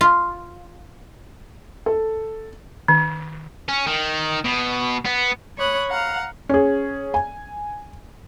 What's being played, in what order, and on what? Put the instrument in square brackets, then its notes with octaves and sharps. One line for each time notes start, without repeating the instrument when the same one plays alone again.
[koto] F4
[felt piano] A4
[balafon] D#3
[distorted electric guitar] C#4
D#3
B2
B3
[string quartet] C#5 B5 D#6 F#6
F5 F#5 A#5
[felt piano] C#4 G#4
G#5